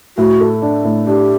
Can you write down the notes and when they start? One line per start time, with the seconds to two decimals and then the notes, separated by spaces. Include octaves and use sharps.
0.17 A2 F#4
0.40 A4
0.62 D4
0.84 A2
1.06 D4 G4